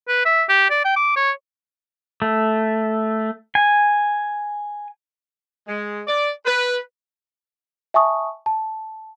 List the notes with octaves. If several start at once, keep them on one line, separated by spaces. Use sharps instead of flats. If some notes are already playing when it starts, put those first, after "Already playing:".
B4
E5
G4
D5
G5
D6
C#5
A3
G#5
G#3
D5
B4
E5 G#5 A5 C#6 D#6
A5